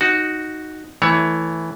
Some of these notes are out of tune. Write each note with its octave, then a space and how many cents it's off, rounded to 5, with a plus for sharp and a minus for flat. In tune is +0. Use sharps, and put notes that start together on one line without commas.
D#4 +0 F#4 +0
E3 -5 A3 +0 C#5 +20